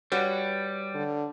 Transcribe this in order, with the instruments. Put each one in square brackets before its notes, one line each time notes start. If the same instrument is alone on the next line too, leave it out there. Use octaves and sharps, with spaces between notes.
[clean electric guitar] G3 [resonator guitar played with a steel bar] F#4 B4 C#5
[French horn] D3